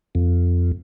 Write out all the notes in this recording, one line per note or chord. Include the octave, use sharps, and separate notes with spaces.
F2